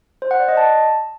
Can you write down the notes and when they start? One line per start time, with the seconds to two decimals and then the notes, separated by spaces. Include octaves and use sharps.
0.22 C5
0.31 F#5
0.40 D5
0.48 D#5
0.57 A5